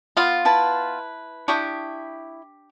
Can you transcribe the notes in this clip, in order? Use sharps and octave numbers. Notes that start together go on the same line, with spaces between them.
B3 F4
E4 B4 A5
D4 E4 G4 C#6 D#6